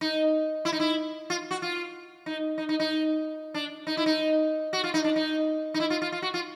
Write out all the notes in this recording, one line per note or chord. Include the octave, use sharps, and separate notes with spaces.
D#4
E4
D#4
E4
F4
F#4
F4
D#4
D#4
D#4
D#4
D4
D#4
E4
D#4
F#4
F4
D#4
D4
D#4
D#4
E4
F4
F4
F4
F#4
F4